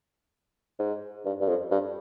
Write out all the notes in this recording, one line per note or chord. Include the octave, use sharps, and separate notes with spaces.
G#2
G2
G2
F2
G2